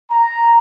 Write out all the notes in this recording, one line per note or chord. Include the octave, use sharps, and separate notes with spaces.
A#5